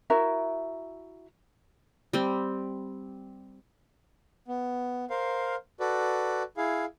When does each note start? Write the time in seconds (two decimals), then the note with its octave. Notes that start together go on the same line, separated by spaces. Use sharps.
0.10 E4 F#4 A#4 E5
2.13 G3 C4
4.48 B3
5.10 A#4 C5 F5
5.80 F#4 A4 B4 D5
6.57 E4 G#4 F5